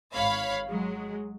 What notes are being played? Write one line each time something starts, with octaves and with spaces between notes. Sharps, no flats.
G#1 C#5 F5 B5
F#3 G#3